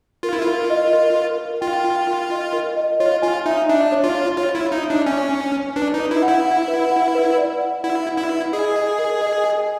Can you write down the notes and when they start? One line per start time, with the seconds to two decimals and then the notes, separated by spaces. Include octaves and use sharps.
0.23 F4 A#4
0.33 E4
0.42 F4 A#4
0.70 D#5
0.93 A#4
1.16 A#4
1.38 A#4
1.61 F4 G5
1.84 G5
2.07 A#4
2.31 D#5
2.53 A#4
2.76 D#5
3.00 F4 C#5
3.22 F4 G#5
3.46 D#4 E5
3.68 D4 E5
3.92 C#5
4.04 F4
4.14 C#5
4.38 F4 C#5
4.55 E4
4.61 C#5
4.72 D#4
4.84 E5
4.90 D4
5.06 C#4 G#5
5.30 C#5
5.53 C#5
5.76 D4 B4
5.94 D#4 B4
6.11 E4
6.23 F#5
6.28 E4
6.45 F#5
6.68 B4
6.92 F#5
7.15 B4
7.38 D5
7.60 F#5
7.83 E4 F#5
8.07 F#5
8.18 E4
8.30 B4
8.53 G#4 D#5
8.75 D#5
8.99 A#4
9.22 D#5
9.45 G#5